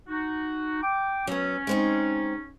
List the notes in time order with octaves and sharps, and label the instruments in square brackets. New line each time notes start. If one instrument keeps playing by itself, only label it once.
[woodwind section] D#4 F#4
G5 D6
[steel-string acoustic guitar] F#3 B3 [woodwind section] C#4
[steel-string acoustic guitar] G#3 C4 D#4